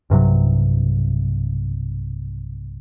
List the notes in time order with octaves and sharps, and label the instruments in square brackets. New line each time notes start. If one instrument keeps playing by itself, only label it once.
[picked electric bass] B1 G2 C3 F#3